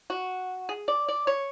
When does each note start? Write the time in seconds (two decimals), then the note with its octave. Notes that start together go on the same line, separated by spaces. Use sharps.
0.10 F#4
0.69 G#4
0.88 D5
1.08 D5
1.27 C#5